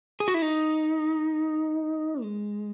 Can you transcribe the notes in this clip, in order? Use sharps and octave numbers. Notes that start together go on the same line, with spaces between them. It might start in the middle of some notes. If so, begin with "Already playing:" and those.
G#4
F#4
E4
D#4
G#3